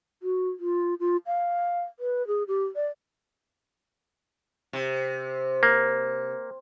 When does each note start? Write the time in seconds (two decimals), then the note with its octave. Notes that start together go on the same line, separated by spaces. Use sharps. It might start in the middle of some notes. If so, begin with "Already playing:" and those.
0.23 F#4
0.60 F4
1.00 F4
1.26 F5
2.00 B4
2.27 G#4
2.48 G4
2.76 D5
4.73 C3
5.63 A#3